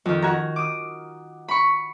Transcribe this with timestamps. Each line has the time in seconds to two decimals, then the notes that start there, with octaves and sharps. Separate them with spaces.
0.06 F2 D#3
0.22 F#4 G#5 A#5
0.56 D6 D#6
1.48 B5 C#6